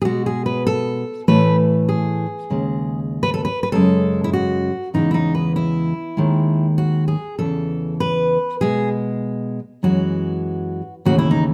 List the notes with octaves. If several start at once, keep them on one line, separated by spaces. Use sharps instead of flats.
G#4
B2 G#3 F#4
G#4
B4
A4
A2 E3 A3 B4
G#4
D#2 C#3 G#3
B4
A4
B4
B4
F#2 C#3 G#3 A4
E4
F#4
E2 C#3 E3 G#3 D#4
E4
D#4
B4
E4
D#2 D#3 G#3
F#4
G#4
E2 C#3 E3 A4
B4
B2 G#3 G#4
F#2 E3 G#3 F#4
D#2 C#3 E3 A3 F#4
E4
D#4